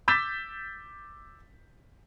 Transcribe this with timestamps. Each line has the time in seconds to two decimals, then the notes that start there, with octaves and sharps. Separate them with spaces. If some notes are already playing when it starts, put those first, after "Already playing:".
0.08 D6 E6 G6 A6 B6 E7